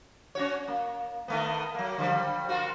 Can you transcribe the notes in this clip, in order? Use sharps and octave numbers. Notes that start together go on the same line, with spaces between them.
C#4 F#4 C#5
A#3
D#3 A3 B3
F#3 A#3
D3 F3 G3
A#3 F4 F#4